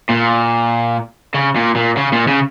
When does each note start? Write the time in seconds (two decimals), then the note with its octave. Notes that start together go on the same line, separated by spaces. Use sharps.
0.10 A#2
1.34 C#3
1.56 A#2
1.76 A#2
1.97 C#3
2.13 A#2
2.28 C#3